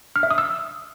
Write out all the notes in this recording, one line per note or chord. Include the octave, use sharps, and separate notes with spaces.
F6
E5
D#6
E6